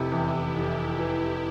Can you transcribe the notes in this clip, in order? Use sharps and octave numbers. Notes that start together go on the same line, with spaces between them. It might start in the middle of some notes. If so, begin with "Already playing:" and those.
Already playing: F1 C3 E4 G4
E2
F1
E3